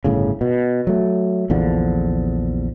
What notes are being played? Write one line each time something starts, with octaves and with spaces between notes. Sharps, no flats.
G1 A2 C#3
B2
F#3 A3
A#1 E2 D3 F3